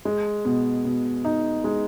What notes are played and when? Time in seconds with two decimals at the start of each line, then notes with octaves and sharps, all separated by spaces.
0.05 G#3
0.45 B2
0.85 B2
1.25 D#4
1.64 G#3